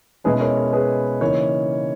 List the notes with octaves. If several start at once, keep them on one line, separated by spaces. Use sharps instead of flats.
B2 G#3 C#4 E4 G#4 B4
A#4 C#5
A#4
G#4 B4
C#3 E3 A#3 D#4 A#4 C#5